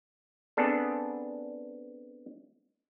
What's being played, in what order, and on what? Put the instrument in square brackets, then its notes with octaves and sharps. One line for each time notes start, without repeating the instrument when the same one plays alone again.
[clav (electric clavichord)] B3 C4 D4 G#4 A4